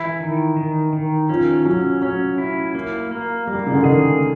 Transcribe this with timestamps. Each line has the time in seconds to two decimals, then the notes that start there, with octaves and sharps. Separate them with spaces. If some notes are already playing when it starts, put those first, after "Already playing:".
Already playing: E3 E4
0.20 D#3
0.57 D#3
0.93 D#3
1.29 F3 C#4
1.65 F#3 C#4
2.02 F#3 C#4
2.38 E4
2.75 A#3
3.11 A#3
3.47 G3 A#3
3.67 C#3
3.75 D3
3.84 D#3 G#4